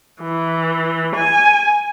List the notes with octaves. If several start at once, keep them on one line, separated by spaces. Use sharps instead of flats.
E3
G#5